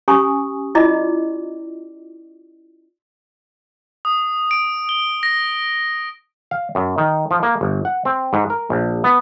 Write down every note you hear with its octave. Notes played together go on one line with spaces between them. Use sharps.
C#4 G4 G#5 A#5 C#6 D#6
E4 F4 D5 D#5 A#5 D6
D#6
D7
G7
A#6
F5
F#2
D#3
F3
A#3
G1
F#5
C4
G#2
A#4
A#1
B3